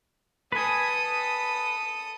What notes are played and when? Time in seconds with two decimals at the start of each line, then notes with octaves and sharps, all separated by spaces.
0.52 A4 B4 G#5 D#6